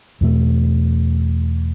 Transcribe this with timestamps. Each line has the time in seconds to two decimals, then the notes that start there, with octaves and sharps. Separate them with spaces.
0.21 E2 B2 A3